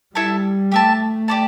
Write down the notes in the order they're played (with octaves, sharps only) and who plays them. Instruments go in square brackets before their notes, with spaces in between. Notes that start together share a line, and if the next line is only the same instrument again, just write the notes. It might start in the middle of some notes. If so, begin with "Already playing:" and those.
[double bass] G3 [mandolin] E4 A4 E5 A5
[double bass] A3 [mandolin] G4 E5 A5
[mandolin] G4 D5 A5